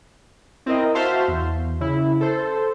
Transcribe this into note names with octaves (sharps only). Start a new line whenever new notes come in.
C4 E4 A#4 D#5
F#4 C5 E5 F5 A5 C6
E2
C#3 E4
A4 C5